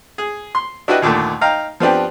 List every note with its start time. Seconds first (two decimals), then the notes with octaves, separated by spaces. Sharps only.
0.18 G#4
0.55 C6
0.88 D4 E4 F#4 G4 B4 D#5
1.02 D#2 A#2 D3 D#3 A3
1.41 D#4 F5 G5 A#5
1.80 F3 B3 C4 D4 G4